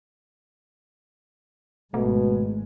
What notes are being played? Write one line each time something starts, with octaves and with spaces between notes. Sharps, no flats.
G#1 B2 G#3 A3